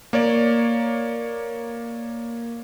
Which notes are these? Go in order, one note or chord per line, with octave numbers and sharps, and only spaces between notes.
A#3 C#5 D5